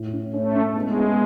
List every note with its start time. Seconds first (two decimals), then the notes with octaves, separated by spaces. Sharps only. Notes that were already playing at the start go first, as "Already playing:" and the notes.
Already playing: A2
0.12 C#4
0.33 A3 C#4
0.54 C#4
0.76 G#3 B3
0.96 B3